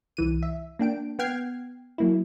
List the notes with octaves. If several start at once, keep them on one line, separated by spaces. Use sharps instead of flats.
C2 E3 D#7
E5
A#3 D4 G5 D7
B3 F#5 G5 F6 G#6 C7
F#3 A#3 E4